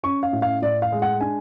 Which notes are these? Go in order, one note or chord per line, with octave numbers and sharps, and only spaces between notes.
C#4 C#6
F5
A2
F5
A2 D5
F5
G#3
F#5
D4 G#5